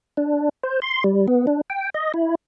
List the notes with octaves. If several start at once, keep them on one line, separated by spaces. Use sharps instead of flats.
D4
C5
C6
G3
B3
D4
G5
D#5
E4